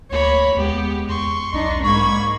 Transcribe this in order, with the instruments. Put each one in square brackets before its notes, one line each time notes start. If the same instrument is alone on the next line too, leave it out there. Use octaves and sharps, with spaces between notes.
[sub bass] D2 [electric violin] A#3 B5 [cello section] C#5
[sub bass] D#2 [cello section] G#3 [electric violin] B3 G4
[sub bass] E2 [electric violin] C6 C#6
[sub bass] B1 [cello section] D4 D#4
[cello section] G#2 A#3 [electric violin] B5 G#6 [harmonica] C#6